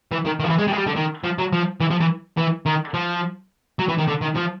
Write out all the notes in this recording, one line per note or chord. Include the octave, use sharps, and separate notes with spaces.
E3
D#3
D#3
F3
E3
G#3
G3
G#3
G3
D3
D#3
F3
F#3
F3
E3
F3
E3
E3
D#3
F3
F#3
E3
D#3
D3
D#3
F3